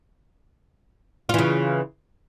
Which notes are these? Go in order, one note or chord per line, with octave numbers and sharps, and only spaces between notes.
C#3 E3 F4